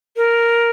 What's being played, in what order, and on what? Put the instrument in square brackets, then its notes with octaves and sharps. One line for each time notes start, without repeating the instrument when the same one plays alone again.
[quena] A#4